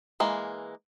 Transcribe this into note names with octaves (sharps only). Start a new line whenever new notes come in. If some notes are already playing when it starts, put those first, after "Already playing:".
E3 G#3 A#3